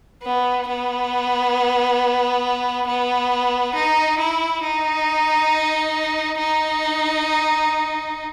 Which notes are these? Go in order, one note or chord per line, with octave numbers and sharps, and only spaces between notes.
B3
B3
B3
D#4
E4
D#4
D#4